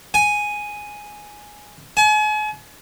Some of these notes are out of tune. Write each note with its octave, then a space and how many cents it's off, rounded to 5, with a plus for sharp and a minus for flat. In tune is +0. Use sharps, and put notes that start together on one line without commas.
G#5 +0
G#5 +40